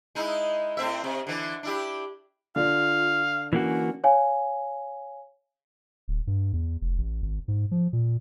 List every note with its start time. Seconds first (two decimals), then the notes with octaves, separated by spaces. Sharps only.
0.15 G#3 D#4 E4
0.77 A2 C4 E5
1.04 C3
1.27 D3 E3
1.63 D4 E4 G4
2.56 D3 F4 F5
3.53 E3 A#3 C#4 F#4
4.04 C#5 F5 G#5
6.08 D1
6.27 G2
6.53 E2
6.81 F1
6.98 A1
7.22 G#1
7.48 G#2
7.71 F3
7.93 A#2